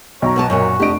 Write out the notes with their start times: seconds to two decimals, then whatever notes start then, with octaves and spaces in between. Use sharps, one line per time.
0.22 B1 C#5 A#5
0.36 B2 B3 A5
0.50 F#2 A#2 F#4 C#5
0.80 F1 D4 G4 D#5 D7